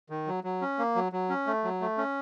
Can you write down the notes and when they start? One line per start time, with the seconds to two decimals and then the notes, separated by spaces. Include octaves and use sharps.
0.10 D#3
0.27 F#3
0.44 F#3
0.61 C#4
0.78 A#3
0.95 F#3
1.12 F#3
1.29 C#4
1.47 A3
1.64 F#3
1.81 A3
1.98 C#4